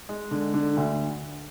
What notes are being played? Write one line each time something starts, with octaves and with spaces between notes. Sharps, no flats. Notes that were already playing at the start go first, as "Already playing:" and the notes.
G#3
D3
D3
D2